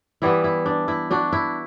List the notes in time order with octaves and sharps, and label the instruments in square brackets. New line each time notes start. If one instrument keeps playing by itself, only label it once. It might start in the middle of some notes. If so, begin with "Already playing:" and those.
[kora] E3 G3 B3 E4
E4
D4
E4
D4 F#4
E4